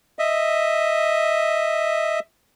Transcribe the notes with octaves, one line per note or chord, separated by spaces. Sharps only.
D#5 E5